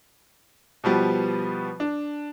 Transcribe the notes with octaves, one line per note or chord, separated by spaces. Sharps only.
B2 F3 G3 B3
D4